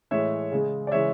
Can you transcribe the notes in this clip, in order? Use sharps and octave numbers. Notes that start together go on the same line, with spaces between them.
A2 E3 G#3 C#5 E5
C#3 G#3
D5
C#3 E3 G#3 C#5 E5